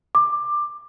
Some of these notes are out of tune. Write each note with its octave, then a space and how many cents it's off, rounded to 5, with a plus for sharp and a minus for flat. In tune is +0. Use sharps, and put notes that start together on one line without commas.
D6 +15